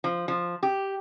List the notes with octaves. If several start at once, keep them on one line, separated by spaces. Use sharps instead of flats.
F3
F3
G4